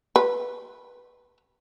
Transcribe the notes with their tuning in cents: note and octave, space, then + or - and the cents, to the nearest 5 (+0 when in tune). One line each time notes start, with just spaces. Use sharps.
B4 -10